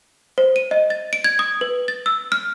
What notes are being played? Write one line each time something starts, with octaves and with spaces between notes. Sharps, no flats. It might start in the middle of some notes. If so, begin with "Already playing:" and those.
C5
D#7
D#5
A6
D7
G#6
D#6
B4
A6
E6
F6